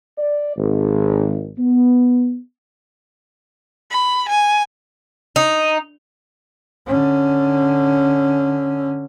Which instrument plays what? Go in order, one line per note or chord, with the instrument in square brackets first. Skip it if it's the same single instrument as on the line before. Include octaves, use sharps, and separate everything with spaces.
[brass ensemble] D5
G#1
B3
[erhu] B5
G#5
[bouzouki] D#4
[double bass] D3 C#4